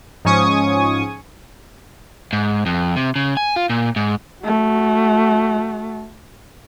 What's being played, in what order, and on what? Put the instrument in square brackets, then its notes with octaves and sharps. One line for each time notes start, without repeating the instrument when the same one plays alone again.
[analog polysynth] G#2 F3 C#4 G#5 C#6 D#6
[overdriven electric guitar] G#2
F2
C3
C#3
G#5
F4
A#2
G#2
[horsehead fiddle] A3 F#4